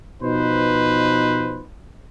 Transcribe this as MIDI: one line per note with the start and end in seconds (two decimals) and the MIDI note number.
0.22 1.65 47
0.22 1.65 53
0.22 1.65 63
0.22 1.65 71
0.22 1.65 72